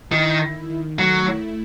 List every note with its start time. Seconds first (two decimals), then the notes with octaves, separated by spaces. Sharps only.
0.12 D#3 E4
0.41 D#3
0.70 D#3
0.99 F#3 A3
1.28 E4